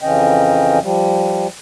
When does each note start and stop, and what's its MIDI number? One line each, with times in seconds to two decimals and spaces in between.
0.02 0.79 41
0.02 0.79 49
0.02 0.79 52
0.02 0.79 61
0.02 0.79 75
0.02 0.79 79
0.82 1.47 53
0.82 1.47 55